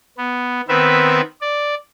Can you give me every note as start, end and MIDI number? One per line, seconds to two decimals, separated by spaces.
0.18 0.61 59
0.68 1.21 51
0.68 1.21 59
0.68 1.21 60
0.68 1.21 71
0.68 1.21 76
1.41 1.75 74